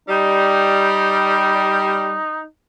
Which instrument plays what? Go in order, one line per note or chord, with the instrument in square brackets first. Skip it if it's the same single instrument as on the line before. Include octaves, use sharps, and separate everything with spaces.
[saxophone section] G3 [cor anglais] D#4